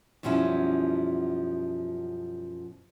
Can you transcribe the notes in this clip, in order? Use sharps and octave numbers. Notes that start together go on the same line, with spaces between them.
F#2 B2 F3 G3 C#4 E4